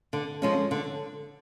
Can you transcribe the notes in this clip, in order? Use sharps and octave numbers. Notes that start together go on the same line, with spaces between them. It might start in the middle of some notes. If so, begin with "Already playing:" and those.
D3
F3 G#3 C#4
D3